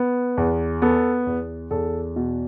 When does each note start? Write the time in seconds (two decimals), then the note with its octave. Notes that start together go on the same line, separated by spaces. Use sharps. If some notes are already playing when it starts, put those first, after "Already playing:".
Already playing: B3
0.37 E2
0.82 B3 A4
1.26 E2
1.70 E2 A4
2.16 B2